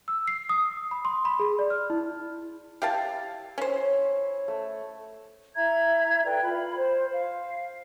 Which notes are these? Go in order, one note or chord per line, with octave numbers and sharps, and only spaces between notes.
E6
C7
D#6
B5
C6
B5
G#4
D5
F6
E4
E4 G4 F5 A5
C#4 C5 C#5
A3
E4 E5 A#5 G#6
A4 B4 D5 G5
F4 B5
C5
F5